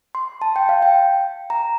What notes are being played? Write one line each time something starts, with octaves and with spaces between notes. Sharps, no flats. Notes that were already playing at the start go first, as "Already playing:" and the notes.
C6
A5
G5
F5
G5
A#5